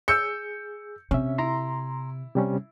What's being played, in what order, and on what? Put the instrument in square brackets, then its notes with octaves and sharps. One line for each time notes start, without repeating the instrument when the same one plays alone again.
[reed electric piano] G#4 [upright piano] E6 G6 C#7
[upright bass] C3 [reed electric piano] C#4 E5
[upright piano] E4 [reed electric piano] A#5 C6
[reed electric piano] C3 G3 C#4